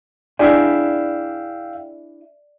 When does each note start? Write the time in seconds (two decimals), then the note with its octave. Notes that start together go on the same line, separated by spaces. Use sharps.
0.39 D4 E4 G#4 D5 E5 F5 G5